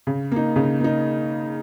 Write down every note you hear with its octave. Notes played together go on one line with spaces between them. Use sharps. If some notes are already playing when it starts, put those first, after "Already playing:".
C#3
A#3 D#4
C#3
A#3 D#4